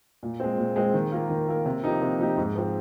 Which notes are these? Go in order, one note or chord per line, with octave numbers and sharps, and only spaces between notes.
A#2
G#3 C4
A#2
G#3 C4
D#3
A#3 F4 A#4
D#3
A#3 F4 A#4
C3
F3 A#3 D#4 G4
C3
F3 A#3 D#4 G4
G#2
F3 C4